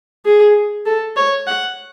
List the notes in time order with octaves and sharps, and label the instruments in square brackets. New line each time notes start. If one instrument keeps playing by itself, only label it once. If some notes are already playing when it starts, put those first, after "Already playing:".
[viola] G#4
A4
C#5
F#5